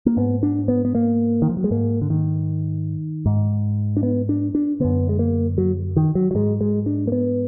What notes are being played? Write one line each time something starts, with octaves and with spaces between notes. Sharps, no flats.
A#3
G#2 B3
D4
B3
B3
A#3
D#3
F3
F#3
G#3
G#2 A#3
D3
D#3
G#2
D4
B3
D4
D4
F#2 D3 B3
G#3
A#3
F#3
D#3
F#3
F#3
G#2 G#3
G#3
D4
A#3
B3